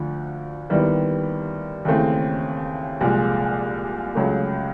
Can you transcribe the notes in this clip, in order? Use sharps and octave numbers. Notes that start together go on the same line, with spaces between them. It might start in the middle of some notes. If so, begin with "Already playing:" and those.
Already playing: D2 D3 F3
D#2 D#3 G3 B3 E4
D#2 C#3 E3 A3 C4
C2 A#2 F3 G#3
C#2 C#3 F#3 A3